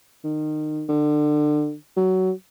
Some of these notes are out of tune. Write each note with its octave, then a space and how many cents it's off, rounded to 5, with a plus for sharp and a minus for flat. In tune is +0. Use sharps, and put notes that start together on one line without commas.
D#3 -25
D3 +30
F#3 +15